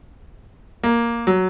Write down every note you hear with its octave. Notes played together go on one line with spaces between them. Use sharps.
A#3
F#3